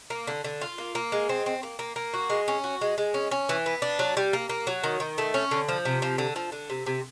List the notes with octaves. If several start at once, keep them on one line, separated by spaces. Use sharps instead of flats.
A#3
D3
D3
F4
A#3
A#3
G#3
C4
C4
A#3
A#3
A#3
F#4
G#3
C#4
F#4
G#3
G#3
C#4
C#4
E3
B3
D4
F#3
G3
A#3
A#3
F#3
D#3
D#3
A3
C#4
D3
F3
C3
F3
D3
F3
D3
C3
C3